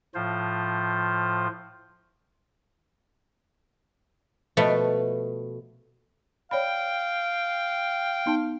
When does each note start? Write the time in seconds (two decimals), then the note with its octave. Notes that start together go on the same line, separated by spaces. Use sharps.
0.15 A2 F3 F4 C5
4.57 B2 F3 A3 B3
6.51 C#5 D5 F5 G5 B5
8.26 B3 D#4 A5